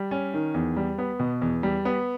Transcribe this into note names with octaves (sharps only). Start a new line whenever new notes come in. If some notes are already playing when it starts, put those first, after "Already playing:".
Already playing: G3
C#4
D#3
E2
G3
B3
B2
E2
G3
B3